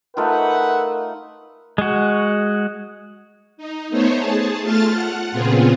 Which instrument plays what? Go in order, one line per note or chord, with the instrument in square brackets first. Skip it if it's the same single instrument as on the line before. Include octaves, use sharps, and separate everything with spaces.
[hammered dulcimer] A3 D#4 F4 [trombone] A#4 [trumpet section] B4 E5 F#5
[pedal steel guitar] G#3 F#4
[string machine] D#4
A3 B3 D#4 C5 C#5
G#4 A5
A3 F4 F5 A5 F6 A6
F#5
A#2 C#3 B3 C4 F4 G#4